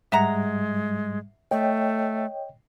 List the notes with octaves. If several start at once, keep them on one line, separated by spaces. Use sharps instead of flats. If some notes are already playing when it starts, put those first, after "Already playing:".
G#2 G3 G#3 E5 F#5 A#5
A3 C#5 D#5 G5